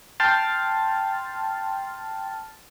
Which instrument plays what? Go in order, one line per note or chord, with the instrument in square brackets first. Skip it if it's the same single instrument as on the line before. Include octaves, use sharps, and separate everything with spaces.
[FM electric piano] G5 A5 C6 F6 A6